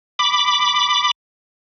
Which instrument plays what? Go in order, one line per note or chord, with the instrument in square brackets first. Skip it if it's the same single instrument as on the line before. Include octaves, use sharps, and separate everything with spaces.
[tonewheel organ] B5 D6